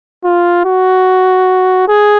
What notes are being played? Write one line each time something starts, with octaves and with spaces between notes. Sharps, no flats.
F4
F#4
G#4